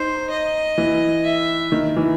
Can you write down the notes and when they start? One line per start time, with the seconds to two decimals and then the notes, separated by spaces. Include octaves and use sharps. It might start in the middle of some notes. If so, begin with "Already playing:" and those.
Already playing: D#4 C5
0.30 D#5
0.78 E3
1.24 E5
1.72 D#3
1.96 E3